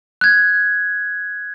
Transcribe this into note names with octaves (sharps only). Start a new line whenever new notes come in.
F#6 G#6